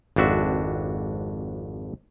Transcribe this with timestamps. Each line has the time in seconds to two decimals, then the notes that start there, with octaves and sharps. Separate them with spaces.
0.16 G#1 F2 D4 F#4 E5